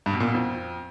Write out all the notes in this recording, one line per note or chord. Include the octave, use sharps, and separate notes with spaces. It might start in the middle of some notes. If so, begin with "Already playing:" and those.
G2
B2
A#2
B2
F2